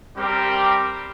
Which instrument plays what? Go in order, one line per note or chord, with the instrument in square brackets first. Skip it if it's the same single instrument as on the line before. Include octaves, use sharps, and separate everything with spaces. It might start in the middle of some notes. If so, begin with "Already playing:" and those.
[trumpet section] G3 C4 G4 A#4